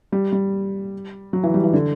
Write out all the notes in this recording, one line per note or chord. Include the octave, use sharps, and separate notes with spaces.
G3
G3
F#3
E3
G3
E3
D3